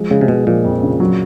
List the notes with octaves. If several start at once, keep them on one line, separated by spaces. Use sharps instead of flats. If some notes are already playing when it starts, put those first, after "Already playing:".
Already playing: F3 G#3
C#3 G#3
C3
B2 G#3
A#2 F3
F2
C#3
F#3